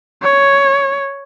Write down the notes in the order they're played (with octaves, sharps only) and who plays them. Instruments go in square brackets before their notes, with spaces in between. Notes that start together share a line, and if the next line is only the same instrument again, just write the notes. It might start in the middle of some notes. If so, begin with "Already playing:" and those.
[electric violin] C#5